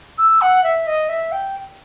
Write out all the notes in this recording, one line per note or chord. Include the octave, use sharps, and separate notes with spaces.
E6
F#5
E5
D#5
E5
G5